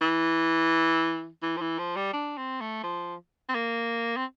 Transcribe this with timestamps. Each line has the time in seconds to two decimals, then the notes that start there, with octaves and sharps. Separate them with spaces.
0.01 E3
1.43 E3
1.57 F3
1.61 E3
1.79 F3
1.96 G3
2.14 D4
2.37 C4
2.61 A3
2.84 F3
3.49 C4
3.55 A#3
4.17 C4